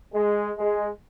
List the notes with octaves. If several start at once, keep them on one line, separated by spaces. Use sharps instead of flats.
G#3
G#3